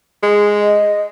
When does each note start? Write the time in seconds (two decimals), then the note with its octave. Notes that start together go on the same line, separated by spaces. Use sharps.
0.23 G#3
0.60 D#5